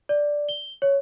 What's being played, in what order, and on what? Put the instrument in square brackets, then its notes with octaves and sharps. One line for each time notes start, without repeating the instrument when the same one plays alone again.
[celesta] D5
G7
C#5